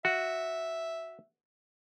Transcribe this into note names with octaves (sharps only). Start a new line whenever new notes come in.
F#4 E5